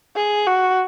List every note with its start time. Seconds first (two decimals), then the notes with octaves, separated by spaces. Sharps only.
0.16 G#4
0.47 F#4